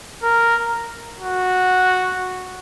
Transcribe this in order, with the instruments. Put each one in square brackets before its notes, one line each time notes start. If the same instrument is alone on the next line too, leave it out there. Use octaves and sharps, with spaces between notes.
[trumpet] A#4
F#4